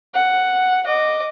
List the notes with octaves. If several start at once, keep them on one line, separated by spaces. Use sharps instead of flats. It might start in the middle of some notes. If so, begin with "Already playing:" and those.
F#5
D#5 D6